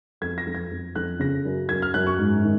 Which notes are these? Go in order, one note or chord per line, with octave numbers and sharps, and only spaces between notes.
F2 G#6
A#6
F2
G#6
F2
F2 F#6
C#3 A#6
F#2
F#2 G#6
F6
F#2 F#6
C#6
G#2
D#3